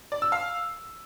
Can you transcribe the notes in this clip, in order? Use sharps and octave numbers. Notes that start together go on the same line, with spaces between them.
D5
E6
F5